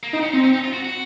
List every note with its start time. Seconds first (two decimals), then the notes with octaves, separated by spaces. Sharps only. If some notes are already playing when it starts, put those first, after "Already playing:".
0.03 A#3
0.13 C4 D#4
0.23 C#4
0.33 C4 D#4
0.44 C#4
0.54 D#4
0.64 F4
0.74 F#4
0.85 F#4